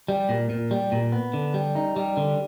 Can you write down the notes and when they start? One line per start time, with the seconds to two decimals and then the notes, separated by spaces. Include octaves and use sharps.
0.08 G3
0.29 A#2
0.50 A#2
0.71 G3
0.92 A#2
1.12 B3
1.34 D3
1.54 G3
1.75 D#4
1.96 G3
2.17 D3